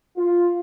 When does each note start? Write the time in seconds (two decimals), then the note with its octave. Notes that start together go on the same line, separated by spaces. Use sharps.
0.17 F4